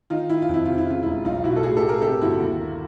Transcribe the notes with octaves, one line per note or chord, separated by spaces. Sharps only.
D#3 D#4 F4
D#3 E4
F4
F2 E4
C3 F4
E4
C#3 F4
E1 E4
B1 D#4 F4
B2 E4 F#4
A4
A2 F#4 G#4
G4 A4
A2
G#4 A#4
C3 G4 A4
G1 E4 F#4
D#2
A#3